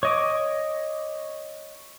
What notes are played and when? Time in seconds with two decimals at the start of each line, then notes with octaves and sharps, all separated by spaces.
0.03 C#5 D#5 D6